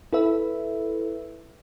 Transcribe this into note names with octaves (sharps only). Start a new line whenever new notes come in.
E4 A4 B4 E5